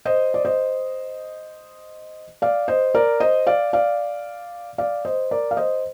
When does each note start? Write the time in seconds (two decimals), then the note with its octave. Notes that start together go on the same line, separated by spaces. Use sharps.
0.05 C5 D#5
0.34 D5
0.45 C5 D#5
2.42 D5 F5
2.68 C5 D#5
2.95 A#4 D5
3.20 C5 D#5
3.47 D5 F5
3.73 D5 F5
4.78 D5 F5
5.05 C5 D#5
5.31 A#4 D5
5.51 F5
5.57 C5 D#5